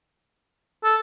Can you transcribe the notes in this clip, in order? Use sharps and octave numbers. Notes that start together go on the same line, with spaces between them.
A4